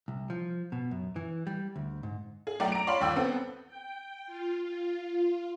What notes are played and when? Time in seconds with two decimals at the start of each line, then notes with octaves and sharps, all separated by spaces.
0.08 C2
0.30 F3
0.72 B2
0.91 F#2
1.16 E3
1.47 G3
1.76 D2
2.03 G#2
2.47 G#4
2.60 B1 A3 D5 G5 A#5
2.72 A#5 D7
2.87 C#5 D5 F5 A5 B5 C6
3.01 G1 D#2 F5 G5 E6
3.16 B3 C4 A4
3.66 G5
4.26 F4
4.64 F4